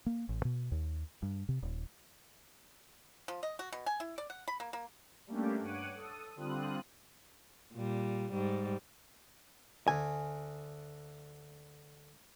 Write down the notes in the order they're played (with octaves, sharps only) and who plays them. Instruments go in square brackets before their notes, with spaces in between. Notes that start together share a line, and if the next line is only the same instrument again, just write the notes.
[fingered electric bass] A#3
A1
B2
D#2
G2
C3
D#1
[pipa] F3
D#5
F#4
B2
G#5
E4
D5
F#5
B5
A#3
A#3
[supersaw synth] G3 A3 A#3 C#4 D4 G4
G2 C#5 F#5 D6 F#6 D#7
A4 D#6
D3 G3 C4 F4 D#6 F#6
[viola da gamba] A#2 G3
G#2 G3
[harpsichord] D2 [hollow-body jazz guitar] G#5